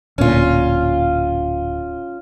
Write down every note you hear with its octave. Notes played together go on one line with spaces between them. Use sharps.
D1 A#2 C#4 F4